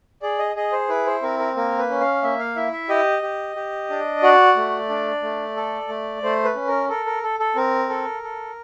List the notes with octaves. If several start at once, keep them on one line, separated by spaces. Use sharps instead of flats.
G#4 D5
D#5
G#4 D#5
C5
E4 B4
C5
C4 A#4
A#4
A#3 A#4
B4
C#4
F5
A#3 E5
F5
E4 E5
E5
G4 D#5
G4
G4
D4
F#4 D5
A3
D4
A3
A4
A3
A3 C5
B4
C#4
A#4
A4 A#4
A#4
A4
A4
C4 A#4
A4
A4